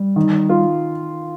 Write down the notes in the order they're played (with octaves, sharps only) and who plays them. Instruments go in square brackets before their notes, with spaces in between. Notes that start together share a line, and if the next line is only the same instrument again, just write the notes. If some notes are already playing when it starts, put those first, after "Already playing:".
Already playing: [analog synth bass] G3
[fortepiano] D#3
F4